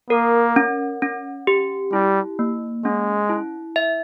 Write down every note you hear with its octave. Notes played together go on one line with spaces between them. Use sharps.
A#3 A#4
C#4
C#4
G4
G3 E4
A#3
G#3 C#4
E4
E5